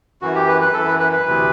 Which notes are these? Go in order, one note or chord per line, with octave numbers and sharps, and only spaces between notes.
F#2 E3 F#4
G4
B4
B4
F#2 E3 A4
B4
B4
B4
D2 C3 E3